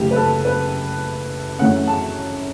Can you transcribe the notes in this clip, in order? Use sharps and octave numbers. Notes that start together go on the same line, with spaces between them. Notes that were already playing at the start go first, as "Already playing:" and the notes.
Already playing: F#1 F#2 E3 A3 G4
B4
A4
B4
F#2 E3 A3 C#4 F#5
A5